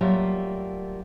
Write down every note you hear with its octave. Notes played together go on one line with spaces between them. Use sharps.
F#3 G3 A3 A#3 F4 E5